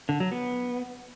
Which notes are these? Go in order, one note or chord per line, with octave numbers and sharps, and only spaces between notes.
D3
F#3
B3